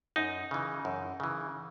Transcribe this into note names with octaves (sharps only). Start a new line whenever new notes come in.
F#2 D#4
C#3 E3
F#2
C#3 E3